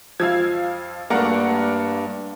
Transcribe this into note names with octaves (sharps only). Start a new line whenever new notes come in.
F2 F3 F5 E6 G#6
G2 A3 A#3 D5 F#5 A#5